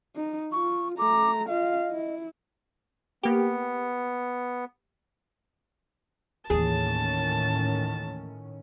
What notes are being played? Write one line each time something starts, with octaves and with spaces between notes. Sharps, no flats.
D#4
F4 C#6
A3 A#5 D6
F4 D#5 F5
E4
A#3 B3 G4
D#2 A2 D#3 E3 C#4 G#4 A5